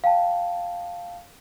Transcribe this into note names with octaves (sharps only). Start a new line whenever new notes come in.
F5 G5 A5